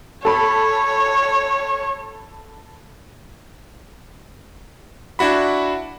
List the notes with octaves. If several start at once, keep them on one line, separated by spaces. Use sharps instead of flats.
A4 C#5 B5
D4 E4 F#4 B5